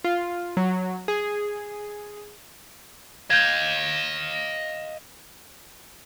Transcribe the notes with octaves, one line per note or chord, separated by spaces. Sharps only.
F4
F#3
G#4
D#5 F5 G6 G#6